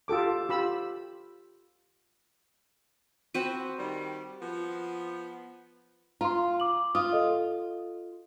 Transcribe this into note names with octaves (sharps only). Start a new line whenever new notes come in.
F4 G4 A4 D6
F4 G4 B5 E6
C4 F#4 B4
D#3 G3
F3 B3
F4 A#5 C6
D6 F#7
F4 D#6
A4 D#5